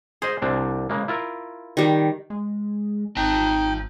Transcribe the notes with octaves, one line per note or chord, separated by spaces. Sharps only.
G#4 C5 D#5 C6
C2 C4 D4
C#3 G#3 A#3
E4 F4 A#4
D#3 G3
G#3
G#1 C4 D#4 G5 A5